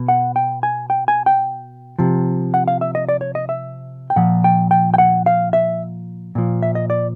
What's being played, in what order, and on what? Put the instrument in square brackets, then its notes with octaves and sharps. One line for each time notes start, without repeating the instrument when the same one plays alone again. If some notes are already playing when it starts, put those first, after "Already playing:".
Already playing: [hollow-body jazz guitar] B2
F#5
G5
G#5
G5
G#5
G5
C3 F3
F#5
F5
E5
D#5
D5
C#5
D#5
E5
G5
A#2 F3 F#5
G5
G5
G5
F#5
F5
E5
A#2 F3
E5
D#5
D5